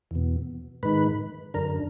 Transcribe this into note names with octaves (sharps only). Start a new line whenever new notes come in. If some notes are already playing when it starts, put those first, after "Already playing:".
E2 B2
G#2 D#3 B4
F#2 D3 A#4